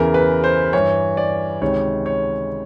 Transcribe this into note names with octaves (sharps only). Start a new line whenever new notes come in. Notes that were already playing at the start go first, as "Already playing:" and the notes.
Already playing: E2 C#3 E3 A#4
B4
C5
G2 E3 C#5
D5
C#2 C3 D#3 C#5
C#5